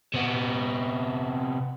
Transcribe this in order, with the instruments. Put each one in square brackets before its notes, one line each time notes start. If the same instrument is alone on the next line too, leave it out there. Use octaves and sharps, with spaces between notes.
[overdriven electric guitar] C3 B3